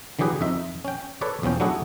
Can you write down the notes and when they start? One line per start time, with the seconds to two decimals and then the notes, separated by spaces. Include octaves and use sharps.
0.19 D3 E3 F#3 G4 G#4 B4
0.41 F2 D#4 E5
0.85 C#4 G5
1.21 A4 B4 C#5 D5
1.42 B1 E2 F3 C#4 G5
1.60 F#3 A3 D4 E4 F#4 G#4